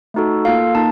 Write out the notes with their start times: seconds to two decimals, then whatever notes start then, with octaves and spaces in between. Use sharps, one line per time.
0.14 A3 D#4 F#4 A4
0.45 A#3 F4 A4 F5
0.75 A#3 D#4 A5